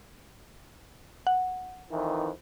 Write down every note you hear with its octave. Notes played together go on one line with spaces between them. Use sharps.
F#5
F2 D#3 E3